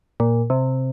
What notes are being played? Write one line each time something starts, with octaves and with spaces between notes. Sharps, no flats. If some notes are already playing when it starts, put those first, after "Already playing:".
A#2
C3